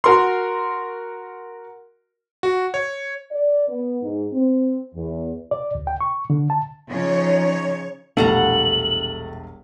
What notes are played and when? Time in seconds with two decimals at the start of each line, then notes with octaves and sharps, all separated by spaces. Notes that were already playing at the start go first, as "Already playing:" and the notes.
0.04 F#4 A#4 C6
2.43 F#4
2.74 C#5
3.31 D5
3.68 B3
4.02 G#2
4.32 C4
4.95 E2
5.51 D5
5.75 D2
5.87 G5
6.01 C#6
6.30 D3
6.50 A5
6.88 C#3 F3 D#4 C#5
8.17 E1 A#1 G3 A3 F5 F#5 A#5 F#7